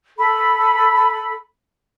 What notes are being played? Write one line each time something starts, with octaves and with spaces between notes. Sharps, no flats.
A4 B5